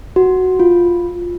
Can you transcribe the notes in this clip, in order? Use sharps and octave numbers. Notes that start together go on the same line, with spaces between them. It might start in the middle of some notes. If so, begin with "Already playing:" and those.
F#4
F4